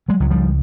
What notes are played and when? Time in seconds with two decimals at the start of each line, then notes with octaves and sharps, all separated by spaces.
0.08 F#3 G#3
0.20 C#2 F#3
0.31 F3 G3